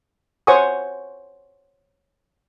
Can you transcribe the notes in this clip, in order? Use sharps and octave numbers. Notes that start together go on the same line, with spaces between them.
C5 C#5 F#5 G#5 C#6 D#6